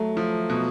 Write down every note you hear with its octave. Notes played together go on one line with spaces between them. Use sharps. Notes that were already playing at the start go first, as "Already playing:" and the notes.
Already playing: F#3 A3
F3
B2